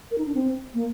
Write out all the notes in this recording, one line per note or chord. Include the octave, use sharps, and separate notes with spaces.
A#4
D#4
D4
C4
A#3